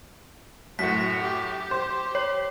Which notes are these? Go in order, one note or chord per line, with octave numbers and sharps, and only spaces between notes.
F#2 A2 F#4 B6
G4
C5
C#5